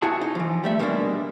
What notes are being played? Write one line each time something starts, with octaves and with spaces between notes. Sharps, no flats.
E4 F#4 G#4 A5
D#4
E3 F3
G3 A3 E5
B2 G3 G#3 A#3 C4 D4